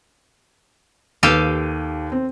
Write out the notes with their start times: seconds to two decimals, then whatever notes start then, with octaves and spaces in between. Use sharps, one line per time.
1.23 D#2 G4 A4 B4 F5 D#7
2.12 C4